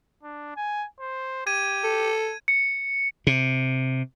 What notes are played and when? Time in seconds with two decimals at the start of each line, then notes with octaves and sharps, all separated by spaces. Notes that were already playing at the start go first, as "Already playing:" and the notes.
0.24 D4
0.56 G#5
1.00 C5
1.47 G4 G#6 D#7
1.84 A4
2.48 C#7
3.27 C3